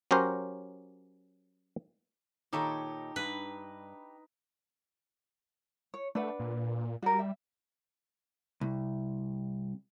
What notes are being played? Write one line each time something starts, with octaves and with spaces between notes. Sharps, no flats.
F#3 C#4 G4 A#4 C5
A#2 D#3 D#4 G4 A4 C#5 B5
G2 B4
C#5
A3 D4 B4 F#5
A#2
G3 F#4 A#4
E5
C2